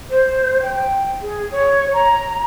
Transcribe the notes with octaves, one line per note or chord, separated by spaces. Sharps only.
C5
G5
G#4
C#5
A#5